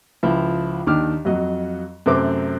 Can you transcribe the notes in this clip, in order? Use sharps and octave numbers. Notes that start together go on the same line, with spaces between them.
C#2 F3 E4
D#2 D#3 D4 D6 F6
F2 F#3 D#5
F#2 C3 A3 C4 D6